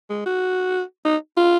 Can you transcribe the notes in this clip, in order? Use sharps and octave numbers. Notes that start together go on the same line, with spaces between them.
G#3
F#4
D#4
F4